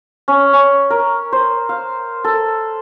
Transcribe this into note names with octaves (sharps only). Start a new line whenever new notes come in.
C#4
C#4
A#4
C5
F5
A4